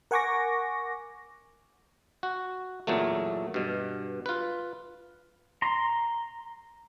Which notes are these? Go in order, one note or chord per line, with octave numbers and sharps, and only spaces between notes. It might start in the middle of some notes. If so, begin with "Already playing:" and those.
A#4 F#5 G#5 C#6 D6 A#6
F#4
E2 A#2 F#3 A3
G2 B2
F4 B4
A#5 C6